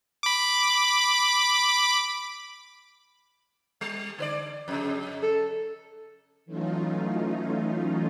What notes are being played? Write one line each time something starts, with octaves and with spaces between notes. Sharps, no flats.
B5 D6
G3
D3 B4 D5
F2 C#3
A4
E3 F#3 A3 C#4 D#4 F4